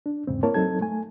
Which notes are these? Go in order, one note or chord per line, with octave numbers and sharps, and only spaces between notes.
D4
E2 G#2 C#3 C4
A#3 C4 E4 A#4 C#5 A5
F#3 C4 D#4 A4 A5 G#6
A3 G#5